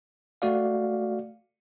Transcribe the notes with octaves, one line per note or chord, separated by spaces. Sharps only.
A3 F#4 D5 F5